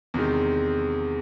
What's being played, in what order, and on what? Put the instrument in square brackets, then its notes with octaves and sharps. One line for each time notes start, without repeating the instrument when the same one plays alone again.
[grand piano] E2 C3 D#3 G#3